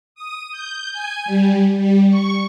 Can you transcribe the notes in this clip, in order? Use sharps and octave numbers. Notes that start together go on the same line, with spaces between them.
D#6
G6
G#5
G3
G3
C#6